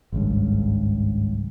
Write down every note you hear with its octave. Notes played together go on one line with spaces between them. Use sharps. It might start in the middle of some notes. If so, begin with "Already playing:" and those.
G#1 C#2 G2